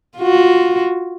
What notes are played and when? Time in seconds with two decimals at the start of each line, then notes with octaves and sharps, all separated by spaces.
0.18 F4 F#4